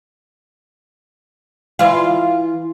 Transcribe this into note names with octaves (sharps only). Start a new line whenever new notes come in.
E3 F4 F5